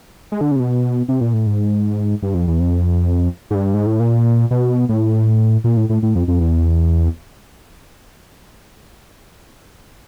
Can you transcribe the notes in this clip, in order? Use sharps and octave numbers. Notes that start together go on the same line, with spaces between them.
G#3
D3
C#3
C3
B2
C3
A#2
A2
G#2
G2
F2
E2
F2
G#2
G2
G#2
A2
A#2
B2
A2
A#2
A2
A2
A2
F2
F2
E2